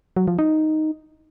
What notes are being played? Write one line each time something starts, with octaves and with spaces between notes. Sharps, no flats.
F#3
F3
D#4